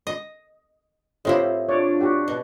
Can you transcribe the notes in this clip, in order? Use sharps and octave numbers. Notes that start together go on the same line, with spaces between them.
D#5
A2 C4 E4 F4 G4 D#5
D4 F4 C#5 D5
F#4 G4
B2